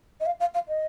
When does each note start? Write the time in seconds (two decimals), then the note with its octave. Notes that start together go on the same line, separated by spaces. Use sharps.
0.20 D#5
0.26 F5
0.40 F5
0.54 F5
0.68 D#5